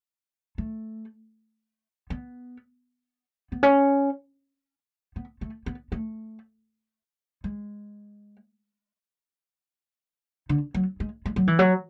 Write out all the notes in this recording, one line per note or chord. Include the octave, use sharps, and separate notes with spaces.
A3
B3
B3
C#4
B3
A3
B3
A3
G#3
D3
F#3
G#3
G#3
F#3
E3
F#3